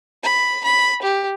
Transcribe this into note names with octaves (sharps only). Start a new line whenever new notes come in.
B5
B5
G4